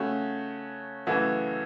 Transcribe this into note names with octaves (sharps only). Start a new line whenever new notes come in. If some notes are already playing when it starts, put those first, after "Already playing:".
Already playing: C#3 A3 C#4 F#4
F#2 C#3 E3 A3 F#4